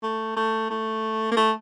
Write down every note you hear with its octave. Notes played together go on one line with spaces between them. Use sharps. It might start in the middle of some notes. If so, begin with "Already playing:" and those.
A3
A3
A3
A#3
A3